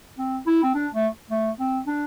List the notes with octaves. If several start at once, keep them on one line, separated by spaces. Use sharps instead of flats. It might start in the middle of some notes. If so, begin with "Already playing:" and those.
C4
E4
C4
D4
A3
A3
C4
D4